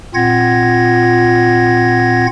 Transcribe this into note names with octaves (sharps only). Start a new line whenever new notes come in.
A#2 C4 F4 F#5 G#6 A#6